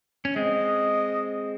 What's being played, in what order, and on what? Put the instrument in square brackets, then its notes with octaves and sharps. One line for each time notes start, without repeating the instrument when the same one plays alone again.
[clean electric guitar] C#4
[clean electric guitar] G#3 C4 [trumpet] D#5